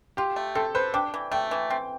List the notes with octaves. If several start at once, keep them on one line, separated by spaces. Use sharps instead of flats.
F4 G4
A3
C4 A4
B4 C5
D4 G5
E3
A3 G5
E3
C4